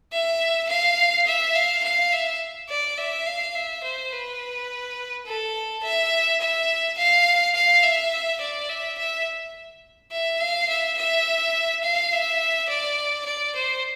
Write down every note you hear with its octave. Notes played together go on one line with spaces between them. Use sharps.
E5
F5
E5
F5
F5
E5
D5
E5
F5
E5
C5
B4
A4
E5
E5
F5
F5
E5
D5
E5
E5
E5
F5
E5
E5
F5
E5
D5
D5
C5